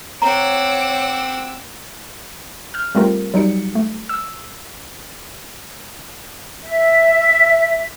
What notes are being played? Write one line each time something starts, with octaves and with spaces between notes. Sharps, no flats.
C4 C#5 F#5 A#5 D6 E6
F6 G6
G3 A3 C4 F4 A#4
F#3 G3 D#4 C#7
A3
E6
E5